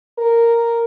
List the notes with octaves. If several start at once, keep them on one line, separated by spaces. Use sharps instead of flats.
A#4